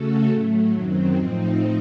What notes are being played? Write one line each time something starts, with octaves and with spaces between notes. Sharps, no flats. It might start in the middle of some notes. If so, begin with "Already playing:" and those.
Already playing: C#3 A3 C#4 F#4 A4
A2 F#3 A3
F#2 D#3 F#3 C4
A2 F3 C4 D#4